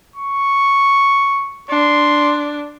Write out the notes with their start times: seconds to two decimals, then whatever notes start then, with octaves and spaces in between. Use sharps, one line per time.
0.16 C#6
1.69 D4 C6